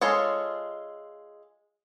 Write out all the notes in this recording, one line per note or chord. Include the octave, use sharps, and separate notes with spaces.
G#3 F4 A4 C#5